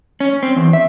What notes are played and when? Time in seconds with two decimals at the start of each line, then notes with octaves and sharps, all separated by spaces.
0.20 C#4
0.43 C4
0.56 E2
0.73 E5